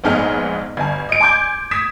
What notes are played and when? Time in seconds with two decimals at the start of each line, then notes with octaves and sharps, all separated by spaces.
0.04 A#1 G#2 B3 D#4 G#4 F6
0.77 G1 G#5
1.09 D#5 D7
1.21 G#5 C6 D6 G6 G#6
1.71 D#6 G#6 B6 E7